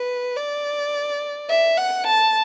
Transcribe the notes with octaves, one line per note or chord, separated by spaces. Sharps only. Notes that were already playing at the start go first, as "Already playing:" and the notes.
Already playing: B4
D5
E5
F#5
A5